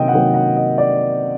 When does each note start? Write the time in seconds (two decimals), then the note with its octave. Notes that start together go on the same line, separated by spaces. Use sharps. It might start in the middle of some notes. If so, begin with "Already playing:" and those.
Already playing: C3 D#3 F#3 A#3 D#5 G5
0.08 F#5
0.13 C3 D#3 F#3 A#3 G5
0.34 F#5
0.57 D#5
0.78 D5